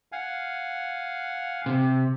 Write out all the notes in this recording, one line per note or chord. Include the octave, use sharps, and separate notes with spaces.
F5 F#5 G#5
C3